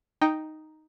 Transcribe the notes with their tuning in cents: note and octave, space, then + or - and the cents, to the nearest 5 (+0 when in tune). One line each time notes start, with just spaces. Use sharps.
D#4 +0 G5 +0